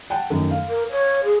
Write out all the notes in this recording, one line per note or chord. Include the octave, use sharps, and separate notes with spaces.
F#5 G5 A5
F#2 D#3 A3
F5
A#4
C#5
G#4